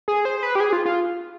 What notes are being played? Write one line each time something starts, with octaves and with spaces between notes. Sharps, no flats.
G#4
C5
B4
G4
G#4
F4
F4